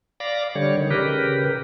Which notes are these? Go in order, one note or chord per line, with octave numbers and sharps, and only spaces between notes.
D5 F5 B5 D6 A#6
D3 G3 C#5
D#3
C#3 G4 A#4 B4